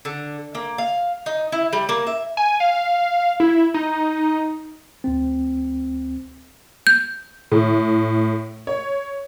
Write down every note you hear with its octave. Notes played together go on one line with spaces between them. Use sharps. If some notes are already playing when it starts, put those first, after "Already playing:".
D3
A#3
F5
D#4
E4
G3
A#3
E5
G#5
F5
E4
D#4
D2 C4
G6
A2
C#5